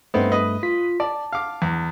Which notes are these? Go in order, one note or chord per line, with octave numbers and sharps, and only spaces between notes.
G2 A3 B3 C4 D#4
B4 D#5
F4 B6
D5 A5
F5 D6
E2